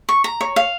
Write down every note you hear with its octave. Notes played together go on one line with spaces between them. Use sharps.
C#6
A#5
C#5
F5